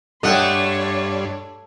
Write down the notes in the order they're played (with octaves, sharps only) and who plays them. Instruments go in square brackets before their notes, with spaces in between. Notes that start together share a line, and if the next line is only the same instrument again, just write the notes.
[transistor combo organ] G2 D4 [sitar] A3 [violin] C#5 C6 [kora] D#5 F#5 G5